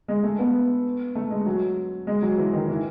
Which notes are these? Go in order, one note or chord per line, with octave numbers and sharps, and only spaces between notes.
G#3
A3
B3
A3
G#3
F#3
G#3
F#3
E3
D#3
E3